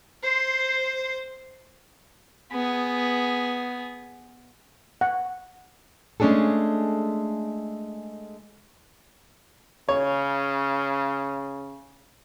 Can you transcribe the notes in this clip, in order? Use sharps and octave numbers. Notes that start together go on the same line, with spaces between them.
C5 C6
B3 G#4
F#5
G#3 A3 C#4 D4 G#4 A4
C#3 C#5